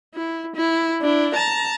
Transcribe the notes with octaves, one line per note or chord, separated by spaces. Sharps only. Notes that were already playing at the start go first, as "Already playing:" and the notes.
E4
E4
D4 E4
A5 A#5